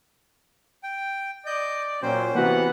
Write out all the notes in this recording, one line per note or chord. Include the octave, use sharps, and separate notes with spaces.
G5
D5 D#5 G6
A#2 F#3 C#4 C5 G5
C3 E3 A#3 B3 F#4 B4 F#5